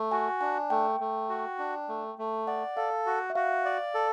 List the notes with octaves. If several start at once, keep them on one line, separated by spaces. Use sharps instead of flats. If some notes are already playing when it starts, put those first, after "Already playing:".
Already playing: A3
F#4 G#5
D4 G#5
A3 G5
A3
F#4
D4
A3
A3
D5 F#5
A4 F5
F#4
E5
F#4 F5
D5
A4